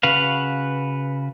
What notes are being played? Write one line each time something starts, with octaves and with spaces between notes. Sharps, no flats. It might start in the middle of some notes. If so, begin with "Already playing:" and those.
C#3 F#4 B4 F5